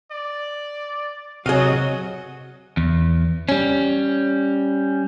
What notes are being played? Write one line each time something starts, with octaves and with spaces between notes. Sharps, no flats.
D5
C3 F#3 F#4 G#4 D#5 F5
E2
G3 C#4